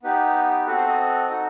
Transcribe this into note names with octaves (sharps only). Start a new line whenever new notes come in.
B3 D#4 G4 B4
C4 F#4 A4 B4
C5
D#5
D#4 F#4 A4